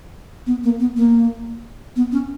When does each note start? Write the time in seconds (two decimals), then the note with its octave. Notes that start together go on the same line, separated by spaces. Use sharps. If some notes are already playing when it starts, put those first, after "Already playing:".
0.47 B3
0.64 A#3
0.80 B3
0.97 A#3
1.96 B3
2.12 C#4